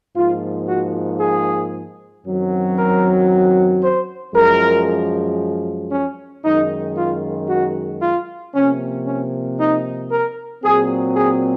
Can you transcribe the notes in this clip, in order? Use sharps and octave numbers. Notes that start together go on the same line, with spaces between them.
G#2 F3 A#3 F4
F#4
G#4
F#2 D#3 F#3 C4
A#4
C5
F#2 F3 G#3 A#4
C#4
F#2 D#3 G#3 D#4
F4
F#4
F4
C3 F3 A#3 C#4
C#4
D#4
A#4
A#2 F#3 C4 G#4
G#4